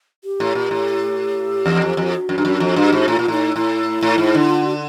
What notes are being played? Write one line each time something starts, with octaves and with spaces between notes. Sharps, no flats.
G4
A2
A#2
A2
E2
F2
F2
F#4
F#2
G2
F#2
F2
G2
G#2
A2 F4
A#2
A2 D#4
A2 E4
A2
G#2
D3
F4
F#4